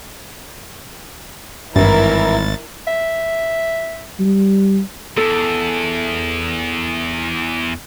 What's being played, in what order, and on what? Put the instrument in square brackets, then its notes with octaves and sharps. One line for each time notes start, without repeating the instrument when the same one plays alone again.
[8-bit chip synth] G#1 A6 [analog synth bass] G2 [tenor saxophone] E3 [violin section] E4 A#4
[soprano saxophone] E5
[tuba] G3
[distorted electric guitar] E2 [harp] A4